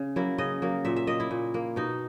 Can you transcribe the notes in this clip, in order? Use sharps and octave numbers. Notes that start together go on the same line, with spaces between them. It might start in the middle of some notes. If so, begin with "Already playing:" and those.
Already playing: C#3
F#3 A#3 E4
C#3 D#5
F#3 A#3
A#2 E5
E5
A#3 D#5
E4
A#2
A#3
B2 D#4